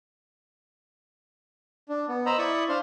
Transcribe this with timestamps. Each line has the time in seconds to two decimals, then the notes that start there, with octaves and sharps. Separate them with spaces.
1.89 D4
2.08 B3
2.26 C5 D#5 A#5 B5 E6
2.38 E4 D5 B5 C#6 D#6
2.69 D4 C5 F5 C6